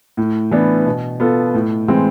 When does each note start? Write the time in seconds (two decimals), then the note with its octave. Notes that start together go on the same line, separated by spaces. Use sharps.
0.17 A2
0.51 E3 B3 D4
0.86 B2
1.20 B3 F4 A4
1.54 A2
1.88 E3 G#3 C4